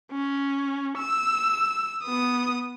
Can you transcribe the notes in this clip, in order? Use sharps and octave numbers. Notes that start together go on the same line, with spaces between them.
C#4
E6
B3 D#6